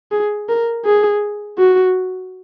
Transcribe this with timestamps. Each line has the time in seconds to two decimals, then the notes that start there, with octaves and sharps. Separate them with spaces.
0.12 G#4
0.49 A#4
0.85 G#4
1.58 F#4